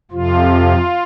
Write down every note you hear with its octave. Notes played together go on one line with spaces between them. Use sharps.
F2 C3 F3 F4